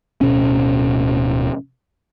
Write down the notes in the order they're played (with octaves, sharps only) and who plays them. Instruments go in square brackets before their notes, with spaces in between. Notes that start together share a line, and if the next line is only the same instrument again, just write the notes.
[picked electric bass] D1 B2 C#4